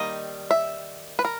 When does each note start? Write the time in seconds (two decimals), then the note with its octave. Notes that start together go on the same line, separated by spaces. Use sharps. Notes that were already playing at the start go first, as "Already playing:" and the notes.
Already playing: D#3 G3 A#3 D#5
0.51 E5
1.19 B4
1.25 A#4